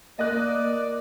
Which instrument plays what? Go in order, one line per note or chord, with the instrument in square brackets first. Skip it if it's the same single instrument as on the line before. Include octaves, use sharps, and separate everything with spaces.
[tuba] A#3 [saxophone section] D5 [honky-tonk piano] D#5 F#6